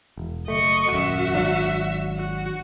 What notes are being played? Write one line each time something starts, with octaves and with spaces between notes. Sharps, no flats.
E1
F#1 A3 D#5 C#6
D#1 F#2 F#4 E5
G#1 F#3 D4
F#4